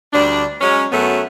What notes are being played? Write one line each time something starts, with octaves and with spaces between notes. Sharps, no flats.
D2 G3 D4
F#3 G#3 C#4
F#2 F#3 A3 B3